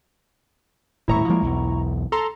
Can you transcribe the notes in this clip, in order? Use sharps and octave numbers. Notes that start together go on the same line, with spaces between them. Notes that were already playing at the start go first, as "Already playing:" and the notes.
D#1 A2 E4 A#5 C#6
F3 G#3 A#3
B1 E2
A4 A#5 C6